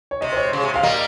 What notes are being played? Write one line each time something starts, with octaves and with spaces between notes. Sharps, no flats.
C#5
C3 D#5
C5
C#5
C#3
C3
C3 F5
G3 A#3 D#5